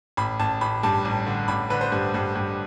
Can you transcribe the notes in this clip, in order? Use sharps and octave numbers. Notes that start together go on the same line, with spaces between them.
A1 B5
A1 A5
A1 B5
G2 A5
A1
D3
A1 B5
D3 B4
C5
G2
G2
G2